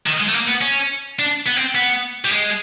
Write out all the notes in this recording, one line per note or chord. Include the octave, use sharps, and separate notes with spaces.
D#3
G#3
A3
A#3
B3
C#4
D4
B3
C4
B3
G3
G#3